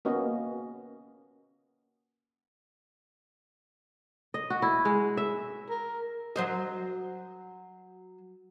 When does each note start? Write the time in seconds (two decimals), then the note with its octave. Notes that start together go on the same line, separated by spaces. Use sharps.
0.05 A#3 B3 C#4 F#4 D#5
4.34 D#5
4.50 F#4
4.62 E4
4.85 G#3
5.17 E5
5.70 A#4
6.36 F#3 C5 D#5